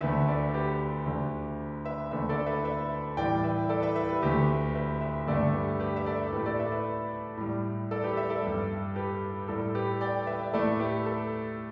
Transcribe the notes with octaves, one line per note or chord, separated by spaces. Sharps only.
D2 D3 A3 B4 E5
A4 D5
G4 B4
D2 D3 A3
B4 E5
D2 D3 A3 B4 E5
A4 D5
B4 E5
B4 E5
A2 E3 G3 D5 G5
B4 E5
A4 D5
B4 E5
B4 E5
G4 B4
D2 D3 A3 G4 B4
B4 E5
B4 E5
G2 D3 A3 A4 D5
G4 B4
G4 B4
E5
A4 D5
A2 A3 G4 B4
A4 D5
B4 E5
B4 E5
A2 G3
A4 D5
G4 B4
B4 E5
A4 D5
G2 G3
G4 B4
A2 G3 A4
G4 B4
D5 G5
B4 E5
E5
A2 A3 A4 D5
G4 B4
A4